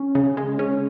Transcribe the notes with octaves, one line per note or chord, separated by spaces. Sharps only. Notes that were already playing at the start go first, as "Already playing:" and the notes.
Already playing: C#4
C#3
G#3
C#4